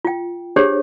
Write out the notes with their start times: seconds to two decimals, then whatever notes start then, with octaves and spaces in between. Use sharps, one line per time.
0.05 F4 G5
0.56 D4 G4 G#4 C5 C#5